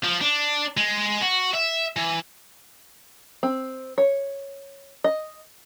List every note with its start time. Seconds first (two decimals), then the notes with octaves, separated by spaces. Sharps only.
0.04 F3
0.21 D4
0.77 G#3
1.21 F#4
1.54 E5
1.96 E3
3.43 C4
3.98 C#5
5.04 D#5